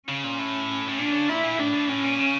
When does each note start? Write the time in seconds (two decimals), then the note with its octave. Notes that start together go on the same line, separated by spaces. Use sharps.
0.09 C#3 C#4
0.24 A#2
0.39 A2
0.88 A2
0.99 A#2 D4
1.13 C#3
1.28 A#2 E4
1.44 A#2
1.59 A2 D4
1.74 A2
1.89 A2 C#4
2.04 A#2
2.19 C#3